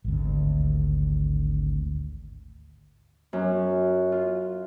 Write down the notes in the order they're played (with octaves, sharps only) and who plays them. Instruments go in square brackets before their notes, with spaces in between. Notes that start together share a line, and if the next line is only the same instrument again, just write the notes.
[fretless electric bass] G#1 D2
[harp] F#2
F4